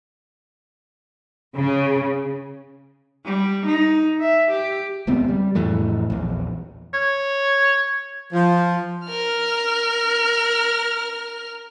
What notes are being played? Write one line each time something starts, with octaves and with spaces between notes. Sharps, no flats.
C#3
G3
D#4
E5
G4
D#1 C#2 B3 C4
G3
F2 A2 E3 A3
A#1 E2
C#5
F3
A#4 F6